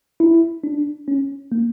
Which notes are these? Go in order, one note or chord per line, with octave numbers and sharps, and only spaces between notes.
E4
D4
C#4
A#3